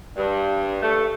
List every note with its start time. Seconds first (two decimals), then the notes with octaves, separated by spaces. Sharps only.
0.16 G2
0.81 A3